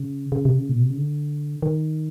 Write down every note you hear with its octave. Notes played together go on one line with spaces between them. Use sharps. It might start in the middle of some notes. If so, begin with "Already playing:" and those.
Already playing: C#3
C#3
C3
C#3
A#2
B2
C3
C#3
D3
D#3